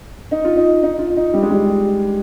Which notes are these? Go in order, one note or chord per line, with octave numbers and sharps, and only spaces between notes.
D#4
F4
D#4
D#4
F4
D#4
G3
G#3
G3